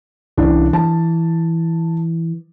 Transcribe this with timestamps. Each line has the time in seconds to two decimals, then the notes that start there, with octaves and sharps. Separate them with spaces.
0.38 C2 E3 C#4 D4
0.73 E3 A5